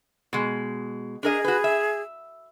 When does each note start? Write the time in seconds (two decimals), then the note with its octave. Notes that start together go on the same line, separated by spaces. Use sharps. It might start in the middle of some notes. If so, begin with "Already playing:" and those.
0.33 B2 G#3
1.23 D4 G#4 A#4 D#5
1.44 F#4 B4
1.64 E5